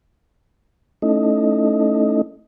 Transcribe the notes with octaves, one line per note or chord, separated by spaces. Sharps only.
A3 C#4 D#4 E4 A4 D#5